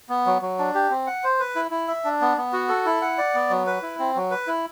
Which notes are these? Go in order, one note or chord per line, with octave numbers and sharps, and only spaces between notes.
B3
F#3
F#3
D4
G4
C4
F#5
C5
B4
E4
E4
E5
D4
B3
B3
F#4
A4
E4
F#5
D5
B3
F#3
B4
E4
C4
F#3
B4
E4